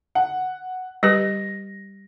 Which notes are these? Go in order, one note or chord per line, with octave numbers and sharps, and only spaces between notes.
F#5
G3 G4 B4 A#6